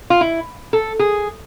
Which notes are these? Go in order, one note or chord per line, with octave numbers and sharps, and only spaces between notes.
F4
E4
A4
G#4